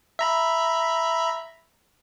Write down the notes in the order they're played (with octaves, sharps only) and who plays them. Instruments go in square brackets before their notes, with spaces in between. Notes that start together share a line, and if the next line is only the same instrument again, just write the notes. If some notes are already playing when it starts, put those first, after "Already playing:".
[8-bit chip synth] E5 A#5 B5